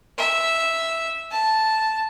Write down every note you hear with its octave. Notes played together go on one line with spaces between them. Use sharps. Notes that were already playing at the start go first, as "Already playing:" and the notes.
E5
A5